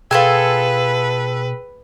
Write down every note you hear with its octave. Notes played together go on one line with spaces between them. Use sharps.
B2 F4 G#4 A4 B4 G5 G#5 E6